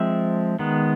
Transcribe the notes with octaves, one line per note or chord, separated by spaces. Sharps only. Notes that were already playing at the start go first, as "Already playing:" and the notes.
Already playing: F3 G#3 C4 E5
D#3 G#3 B3